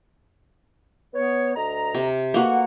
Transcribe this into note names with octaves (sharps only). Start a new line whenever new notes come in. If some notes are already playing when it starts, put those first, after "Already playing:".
B3 C#5
D2 D#5 A#5
C3
A3 A#3 F#4 B4 F#5